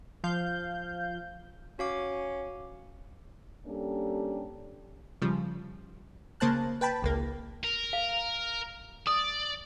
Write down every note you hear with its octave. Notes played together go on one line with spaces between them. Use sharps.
F3 F5 G6
C#4 F#4 F5 D6
G3 A#3 C#4 D4 G4 A4
C#3 F3 G3
C#3 A#3 C5 A5 F#6
B4 G5 A5 B5
G#1 C#2 A#3
A#4
F5
D5 D#6